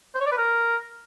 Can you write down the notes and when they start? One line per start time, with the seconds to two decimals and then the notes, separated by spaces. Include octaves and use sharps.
0.15 C5
0.20 C#5
0.26 D5
0.32 B4
0.37 A#4